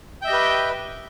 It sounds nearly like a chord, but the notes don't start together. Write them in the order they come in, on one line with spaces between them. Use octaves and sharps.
G5 E5 D#5 G4 B4